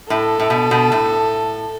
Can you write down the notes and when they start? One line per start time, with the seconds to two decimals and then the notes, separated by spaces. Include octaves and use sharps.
0.10 A2 A4
0.40 A2
0.50 B2
0.71 B2
0.92 A2